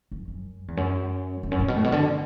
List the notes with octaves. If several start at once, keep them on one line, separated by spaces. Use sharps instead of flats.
F#2
F#2
E2
F#2
E2
F#2
A2
B2
A2
B2
D3